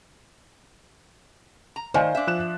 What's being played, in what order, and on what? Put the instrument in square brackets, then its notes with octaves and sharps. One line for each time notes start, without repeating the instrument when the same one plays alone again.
[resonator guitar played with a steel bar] A#5
[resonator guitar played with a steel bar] D#3 [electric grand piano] C5 [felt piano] D5 F5 G#5
[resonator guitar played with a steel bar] D4 E5
[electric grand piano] F3 F#6 E7